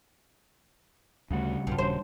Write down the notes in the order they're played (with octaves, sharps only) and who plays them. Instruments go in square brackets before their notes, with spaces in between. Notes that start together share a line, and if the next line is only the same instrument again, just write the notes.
[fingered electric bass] D2 A3 [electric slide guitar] C#3 G3 F#4
[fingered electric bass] B1 [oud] G2 F4
[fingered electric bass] D#1 [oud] C5